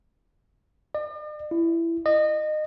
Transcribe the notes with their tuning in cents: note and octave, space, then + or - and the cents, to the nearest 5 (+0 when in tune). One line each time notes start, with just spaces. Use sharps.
D5 +45
E4 +15
D#5 -25